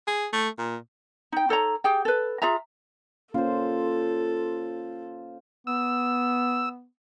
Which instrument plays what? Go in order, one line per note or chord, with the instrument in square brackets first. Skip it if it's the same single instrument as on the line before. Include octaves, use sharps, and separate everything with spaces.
[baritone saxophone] G#4
A3
A#2
[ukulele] D#4 G5
D#4 A4 C#5 A#5
G4 G#4 G5
A4 B4
F4 G#4 E5 A#5
[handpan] A#3 C#4 [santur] F4 C5 [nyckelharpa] A4
[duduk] B3 [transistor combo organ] E6